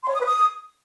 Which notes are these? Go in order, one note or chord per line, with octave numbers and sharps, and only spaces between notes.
C6
C#5
D#6
B4
D#6